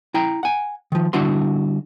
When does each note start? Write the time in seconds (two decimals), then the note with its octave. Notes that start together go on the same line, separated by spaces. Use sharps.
0.14 E4 G5 A#5
0.43 F#5 G#5
0.92 D#3 F3
1.13 D3 G3 D4 E4 F#4 C6